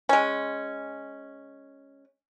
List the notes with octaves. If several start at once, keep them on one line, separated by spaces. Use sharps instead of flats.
G#3 C#4